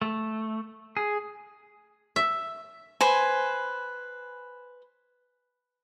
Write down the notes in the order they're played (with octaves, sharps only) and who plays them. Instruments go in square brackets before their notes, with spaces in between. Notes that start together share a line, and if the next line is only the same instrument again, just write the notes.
[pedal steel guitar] A3
G#4
[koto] E5
[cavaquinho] B4 C5 G#5